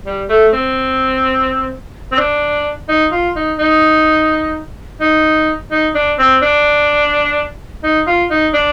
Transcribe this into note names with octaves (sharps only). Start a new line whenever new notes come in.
G3
A3
C4
C4
D4
D#4
F4
D#4
D#4
D#4
D#4
D4
C4
D4
D#4
F4
D#4
D4